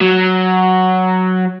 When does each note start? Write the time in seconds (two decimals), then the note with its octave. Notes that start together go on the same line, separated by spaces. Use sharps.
0.01 F#3